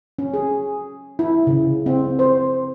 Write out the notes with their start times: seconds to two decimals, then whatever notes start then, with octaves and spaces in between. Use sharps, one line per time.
0.19 C#4
0.34 G#4
1.19 E4
1.47 C#3
1.86 C4
2.19 C5